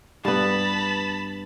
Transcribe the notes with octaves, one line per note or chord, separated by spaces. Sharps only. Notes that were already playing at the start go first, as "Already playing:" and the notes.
G2 B3 A5 B5